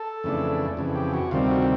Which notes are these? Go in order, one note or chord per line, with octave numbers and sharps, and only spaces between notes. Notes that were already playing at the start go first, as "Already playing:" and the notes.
Already playing: A4
F2 C#3 E3 A3 D4
F2 C#3 E3
G4
F#4
D2 C3 D#3 G3 C4 F4
F#4